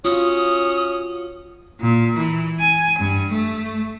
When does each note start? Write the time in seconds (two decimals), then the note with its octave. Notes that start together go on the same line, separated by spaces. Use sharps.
0.05 C#4 F4 F#4 D#6
1.80 A#2
2.16 E3
2.59 G#5
2.98 G2
3.32 A3